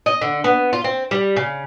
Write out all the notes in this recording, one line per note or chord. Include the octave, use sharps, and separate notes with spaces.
D#5
D3
B3
F4
C4
G3
C#3